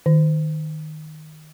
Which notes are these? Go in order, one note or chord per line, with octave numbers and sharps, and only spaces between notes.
D#3